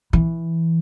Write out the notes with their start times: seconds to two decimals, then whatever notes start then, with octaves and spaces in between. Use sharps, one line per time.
0.13 E3